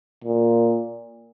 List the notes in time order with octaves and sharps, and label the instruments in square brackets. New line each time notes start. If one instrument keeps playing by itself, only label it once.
[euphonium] A#2